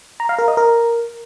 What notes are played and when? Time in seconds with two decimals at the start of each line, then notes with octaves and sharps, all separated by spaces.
0.20 A#5
0.29 F5
0.39 A#4
0.48 D#5
0.57 A#4